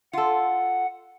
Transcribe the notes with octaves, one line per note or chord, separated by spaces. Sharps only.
F4 A4 F#5